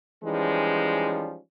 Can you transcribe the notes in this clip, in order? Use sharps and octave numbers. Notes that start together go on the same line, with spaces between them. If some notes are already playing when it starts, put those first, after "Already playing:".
E3 F3 G3 G#3 C#4 D#4